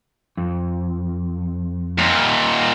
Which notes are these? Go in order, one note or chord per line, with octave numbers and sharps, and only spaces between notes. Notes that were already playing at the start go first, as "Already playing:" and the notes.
F2
D#2 A#2